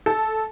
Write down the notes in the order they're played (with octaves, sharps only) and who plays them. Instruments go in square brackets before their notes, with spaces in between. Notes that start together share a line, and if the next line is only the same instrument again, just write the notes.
[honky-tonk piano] A4